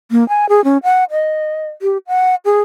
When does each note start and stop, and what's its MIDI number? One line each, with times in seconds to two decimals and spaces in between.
0.11 0.27 58
0.29 0.49 80
0.49 0.64 68
0.64 0.78 61
0.83 1.04 78
1.11 1.68 75
1.82 1.98 67
2.07 2.35 78
2.45 2.62 68